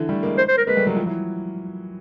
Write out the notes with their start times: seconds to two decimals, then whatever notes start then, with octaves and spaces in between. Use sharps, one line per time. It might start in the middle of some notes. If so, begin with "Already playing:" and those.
Already playing: D3 E3
0.09 G3 A3
0.23 G#3 A#3
0.38 C5
0.48 C5
0.57 A#4
0.67 G#3 A#3 B4
0.77 G3 A3
0.87 F#3 G#3
0.96 F3 G3
1.06 E3 F#3